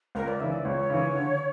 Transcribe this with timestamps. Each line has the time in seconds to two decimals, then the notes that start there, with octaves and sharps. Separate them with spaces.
0.15 C#2 A#4
0.28 D5
0.40 C#3 E3 E5
0.53 D5
0.65 C#2 C#5
0.90 C#3 E3
1.15 D3